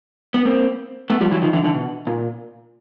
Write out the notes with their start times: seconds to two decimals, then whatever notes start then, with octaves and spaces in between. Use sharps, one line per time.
0.34 B3
0.45 A#3 C4
1.10 A3 B3
1.21 F3 G3
1.31 E3 F#3
1.42 D#3 F3
1.53 D3 E3
1.64 D3 E3
1.75 B2
2.07 A#2